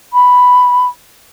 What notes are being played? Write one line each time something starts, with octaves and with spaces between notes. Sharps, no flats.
B5